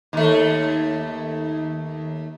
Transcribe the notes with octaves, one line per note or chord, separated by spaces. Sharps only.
D#2 A3